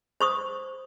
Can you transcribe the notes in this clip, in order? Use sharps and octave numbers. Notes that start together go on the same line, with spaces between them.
C5 C#6 D#6